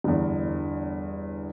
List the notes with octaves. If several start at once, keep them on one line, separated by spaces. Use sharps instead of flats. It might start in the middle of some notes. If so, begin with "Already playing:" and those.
G1 E2